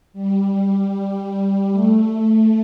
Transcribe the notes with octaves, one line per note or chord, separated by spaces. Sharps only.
G3
G3
G3
A3